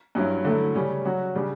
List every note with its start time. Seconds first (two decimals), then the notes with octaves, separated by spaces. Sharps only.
0.15 G2 F#3 C#4 E4
0.45 D3 F#3 A3 E4
0.75 C#3 G3 C#4
1.05 F#3 C#4 F#4
1.35 C#3 G3 D4